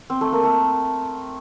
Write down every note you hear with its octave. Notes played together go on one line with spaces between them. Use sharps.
C4
A3
A#3
A3